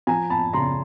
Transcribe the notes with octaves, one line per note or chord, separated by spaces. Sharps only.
F3 G#5 A#5
A5 B5
C#3 A#5 C6